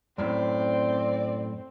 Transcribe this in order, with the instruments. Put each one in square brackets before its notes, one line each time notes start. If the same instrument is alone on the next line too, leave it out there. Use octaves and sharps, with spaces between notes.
[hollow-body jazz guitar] F#2 A2 [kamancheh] C4 [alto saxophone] D5